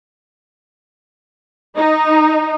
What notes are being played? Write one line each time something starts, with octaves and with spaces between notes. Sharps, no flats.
D#4